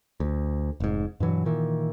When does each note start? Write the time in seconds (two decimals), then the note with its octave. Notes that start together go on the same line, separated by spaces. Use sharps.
0.20 D2
0.80 F1 G#2
1.20 G2 B2 E3 F#3
1.45 A#2 D#3 E3